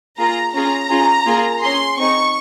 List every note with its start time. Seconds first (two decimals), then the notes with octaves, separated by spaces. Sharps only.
0.17 A#3 F4 G#4 A#5
0.54 C#4 F4 G#4 A#5
0.90 C#4 F4 G#4
1.26 A#3 F4 G#4
1.61 C#4 G#4 C6
1.97 C4 D#4 G#4 C#6